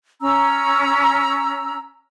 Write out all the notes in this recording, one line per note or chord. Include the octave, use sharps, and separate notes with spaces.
C#4 A#5 E6